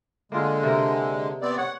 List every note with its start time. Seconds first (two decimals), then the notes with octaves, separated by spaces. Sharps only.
0.32 D3 G#3 A#3 F4 G#4
0.63 C3 A#4
1.42 B3 C4 D5
1.58 C#5 F#5